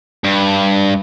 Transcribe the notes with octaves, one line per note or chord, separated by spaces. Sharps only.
G2